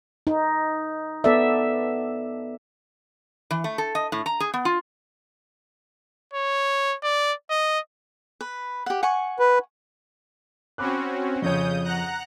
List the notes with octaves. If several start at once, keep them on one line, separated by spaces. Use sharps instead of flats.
D#4
B3 A4 D5 E5
E3
A3
A4
D#5
A2
A#5
G#4
B3
F4
C#5
D5
D#5
B4
G4 F#5
F#5 G#5 C#6
B4
C4 C#4 F#4 B5 D6 F#6
F2 C#3 F3 C#5 D#6 G6
F#5 A#5 F#6